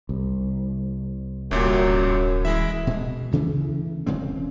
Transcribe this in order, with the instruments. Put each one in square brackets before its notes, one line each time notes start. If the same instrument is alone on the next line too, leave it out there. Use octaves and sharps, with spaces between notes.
[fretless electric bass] C2
[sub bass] D1 [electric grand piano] G1 A#2 G3 [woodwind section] F#2
[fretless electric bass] E3 [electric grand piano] G#3 E4 E5
[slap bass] B2 G#3
D2 C#3 E3 A3
E1 C#3 G#3 C4